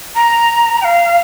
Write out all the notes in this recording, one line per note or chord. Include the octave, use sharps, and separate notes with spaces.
A#5
G5
F5